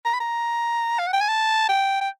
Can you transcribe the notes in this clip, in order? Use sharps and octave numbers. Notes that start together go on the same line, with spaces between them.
A#5
B5
A#5
F5
F#5
G5
G#5
A5
G5
G5